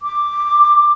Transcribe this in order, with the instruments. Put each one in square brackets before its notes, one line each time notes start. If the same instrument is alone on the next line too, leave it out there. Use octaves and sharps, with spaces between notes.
[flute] D6